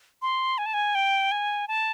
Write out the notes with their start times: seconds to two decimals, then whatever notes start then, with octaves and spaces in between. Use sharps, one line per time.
0.22 C6
0.58 G#5
0.66 A5
0.74 G#5
0.95 G5
1.31 G#5
1.68 A5